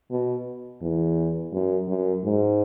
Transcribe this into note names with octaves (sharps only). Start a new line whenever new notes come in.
B2
E2
F#2
F#2
G#2